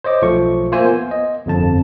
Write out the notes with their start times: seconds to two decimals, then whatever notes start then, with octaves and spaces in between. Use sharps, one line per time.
0.04 C5 C#5 D#5 D6
0.22 B1 F3 A3 C#6
0.72 A#3 F4 C5 E5 G#5
0.84 B3
1.11 D#5
1.46 G1 F2 A5